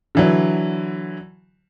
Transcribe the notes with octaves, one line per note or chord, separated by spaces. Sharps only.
D3 E3 F#3